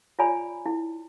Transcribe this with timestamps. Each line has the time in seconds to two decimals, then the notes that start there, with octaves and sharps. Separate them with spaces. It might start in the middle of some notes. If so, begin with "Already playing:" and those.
0.19 F4 C#5 D5 G#5 A#5 B5
0.66 E4